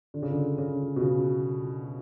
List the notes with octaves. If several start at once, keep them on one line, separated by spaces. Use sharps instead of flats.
D3
C#3
D3
C#3
B2
C#3